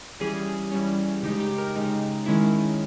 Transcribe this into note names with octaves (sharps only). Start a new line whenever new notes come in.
E3 G3 C#4 G#4
E3 G3 C#4
C#3 G#3 D#4 G4
G4
A#4
C#3 G#3 D#4
D#3 G#3 C#4 E4